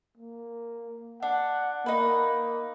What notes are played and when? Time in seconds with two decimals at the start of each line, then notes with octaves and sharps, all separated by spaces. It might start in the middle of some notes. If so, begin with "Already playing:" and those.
0.17 A#3
1.23 D4 F#5
1.86 A#3 D#4 B4